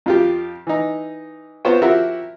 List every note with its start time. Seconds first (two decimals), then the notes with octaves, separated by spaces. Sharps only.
0.06 F2 F4 G4
0.67 E3 D#4
1.65 B3 C4 F4 C5 C#5 G5
1.82 F3 C4 E4 F#4 G4 A#4